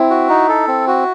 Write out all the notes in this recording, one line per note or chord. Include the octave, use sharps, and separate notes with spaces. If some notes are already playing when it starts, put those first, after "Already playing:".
Already playing: C4 E4
F#4
D#4
A4
C4
F#4